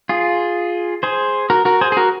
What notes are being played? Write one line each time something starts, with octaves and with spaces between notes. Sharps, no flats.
F4 G#4
G#4 C5
F#4 A#4
F#4 A#4
G#4 C5
G#4
F#4 A#4